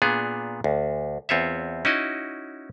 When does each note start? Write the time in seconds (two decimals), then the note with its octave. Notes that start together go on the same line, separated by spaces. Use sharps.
0.02 A#2 B3 D4 G#4
0.64 D2
1.29 E2 C4 F4 C#5 E5
1.85 C#4 D#4 E4 F#4 D#5